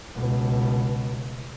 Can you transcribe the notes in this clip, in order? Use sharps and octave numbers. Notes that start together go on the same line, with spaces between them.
C#2 B2